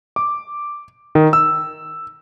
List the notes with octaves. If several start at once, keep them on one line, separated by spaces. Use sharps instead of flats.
D6
D#3
E6